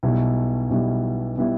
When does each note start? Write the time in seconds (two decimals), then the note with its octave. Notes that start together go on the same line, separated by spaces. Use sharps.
0.03 B1 B2 G3 B3 E4
0.70 B1 B2 G3 B3 E4
1.38 B2 G3 B3 E4